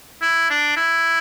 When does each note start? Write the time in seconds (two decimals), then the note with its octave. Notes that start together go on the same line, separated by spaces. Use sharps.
0.22 E4
0.50 D4
0.77 E4